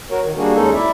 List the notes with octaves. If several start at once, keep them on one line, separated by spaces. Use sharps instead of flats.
F#4 A#4 C#5
D#3
G3 A#3 D4 F#4 G#4
D#2 G#3 C#4 D#4 G#4 A4
E4 D5 E5